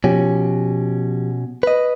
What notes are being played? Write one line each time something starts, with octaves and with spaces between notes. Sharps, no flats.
B2 F3 C#4 G4
B4 D#5